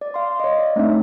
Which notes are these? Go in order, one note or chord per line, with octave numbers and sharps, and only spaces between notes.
D5
F5 C6
C#5 D#5
D5
A3 C4 D4 D#4 E5